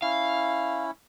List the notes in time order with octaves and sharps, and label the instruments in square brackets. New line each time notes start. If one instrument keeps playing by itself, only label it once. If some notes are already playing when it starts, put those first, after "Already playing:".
[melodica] C#4 E4 [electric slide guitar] F5